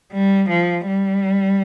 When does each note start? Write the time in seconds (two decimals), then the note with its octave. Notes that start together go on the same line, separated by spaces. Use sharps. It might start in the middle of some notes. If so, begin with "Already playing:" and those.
0.12 G3
0.49 F3
0.87 G3